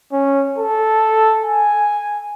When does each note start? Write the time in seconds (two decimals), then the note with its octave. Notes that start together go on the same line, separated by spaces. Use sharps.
0.12 C#4
0.58 A4
1.45 G#5